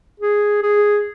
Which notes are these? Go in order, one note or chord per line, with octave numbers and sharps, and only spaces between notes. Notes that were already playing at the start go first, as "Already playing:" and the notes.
G#4
G#4